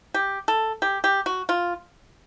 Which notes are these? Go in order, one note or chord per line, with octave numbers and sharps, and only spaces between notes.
G4
A4
G4
G4
F#4
F4